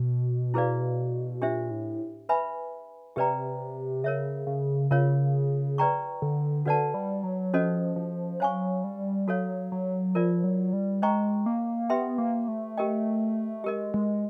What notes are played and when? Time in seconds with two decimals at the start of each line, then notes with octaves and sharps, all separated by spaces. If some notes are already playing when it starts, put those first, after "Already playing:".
Already playing: B2
0.54 E4 G#4 B4 D5 F5
1.41 A#2 D4 G4 C5 E5
1.70 A2
2.29 B4 E5 G#5 B5
3.16 C3 G4 B4 D5 G5 A#5
4.04 C#3 A#4 C#5 E5
4.47 C#3
4.90 C#3 F4 A#4 C#5 F5
5.78 B4 D5 G5 A#5 C#6
6.22 D3
6.66 D3 F#4 B4 D5 F#5 A5
6.94 G3
7.24 F#3
7.54 F3 C#4 F#4 A4 C5 D#5
7.96 F3
8.40 F#3 C5 F5 G#5 C#6
8.84 G3
9.27 F#3 F#4 A4 C#5 F5
9.72 F#3
10.15 F3 F4 A#4 D5
10.44 F#3
10.73 G3
11.02 G#3 C5 D#5 G5 A#5 C#6
11.46 A#3
11.90 B3 G4 B4 E5 G5 C6
12.18 A#3
12.48 A3
12.78 G4 A#4 D#5 G5
13.64 G#3 G4 A#4 D#5
13.94 G#3